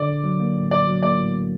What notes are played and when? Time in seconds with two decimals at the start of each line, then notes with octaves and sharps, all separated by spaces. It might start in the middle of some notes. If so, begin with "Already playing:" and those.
Already playing: D3 D5
0.08 A#1
0.24 F#3
0.40 A#3
0.56 A2
0.71 A#1 D5
0.87 F#3
1.03 A#3 D5
1.18 A2